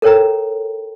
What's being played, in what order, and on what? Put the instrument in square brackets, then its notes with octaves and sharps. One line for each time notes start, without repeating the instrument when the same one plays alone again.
[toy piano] A4 A#4 C#5 G5 A#5